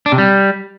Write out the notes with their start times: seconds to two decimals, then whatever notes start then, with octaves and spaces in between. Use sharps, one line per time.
0.06 D4
0.12 C3
0.18 G3